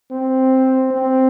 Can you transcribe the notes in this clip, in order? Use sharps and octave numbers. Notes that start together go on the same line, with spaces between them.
C4
C4